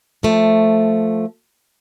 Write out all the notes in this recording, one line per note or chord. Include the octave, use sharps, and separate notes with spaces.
F3 A3